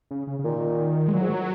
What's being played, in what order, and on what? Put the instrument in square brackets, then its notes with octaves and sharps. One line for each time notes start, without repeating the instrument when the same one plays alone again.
[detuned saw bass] C#3
C#3
C#3
[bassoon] A#2 [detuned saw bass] D#3
[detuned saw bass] G#3
[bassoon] A#2 [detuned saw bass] F#3
[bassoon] G#2